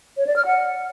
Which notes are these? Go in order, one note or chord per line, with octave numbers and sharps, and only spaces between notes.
C#5
D5
F6
F#5